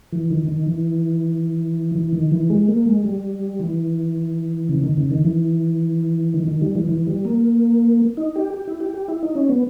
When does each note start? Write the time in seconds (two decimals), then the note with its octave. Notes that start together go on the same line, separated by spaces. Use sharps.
0.12 E3
0.30 D#3
0.48 D#3
0.66 E3
1.95 E3
2.13 D#3
2.31 E3
2.50 G#3
2.68 A#3
2.86 G#3
3.04 G3
3.60 E3
4.69 C#3
4.83 D#3
4.97 C#3
5.11 D#3
5.24 E3
6.34 D#3
6.48 D#3
6.62 G3
6.75 E3
6.89 E3
7.07 G3
7.25 A#3
8.17 D#4
8.35 G4
8.54 G4
8.68 E4
8.80 G4
8.94 G4
9.08 E4
9.23 D#4
9.35 C#4
9.49 B3